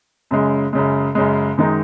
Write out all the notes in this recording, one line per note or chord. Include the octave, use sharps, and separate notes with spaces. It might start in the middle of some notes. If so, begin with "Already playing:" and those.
F#2 C#3 G#3
F#2 C#3 G#3
F#2 C#3 G#3
F#2 D#3 G#3 D#4